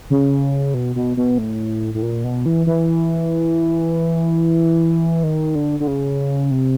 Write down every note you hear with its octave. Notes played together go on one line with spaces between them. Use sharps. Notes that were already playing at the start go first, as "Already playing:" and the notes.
C#3
B2
B2
B2
A2
A2
A#2
B2
E3
E3
D#3
D3
D3
C#3
C3